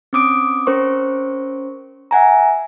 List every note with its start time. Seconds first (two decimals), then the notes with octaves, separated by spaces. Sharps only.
0.13 C4 C#4 D6 D#6 D7
0.67 C#4 A#4 C5 C#6
2.11 E5 F#5 G#5 A#5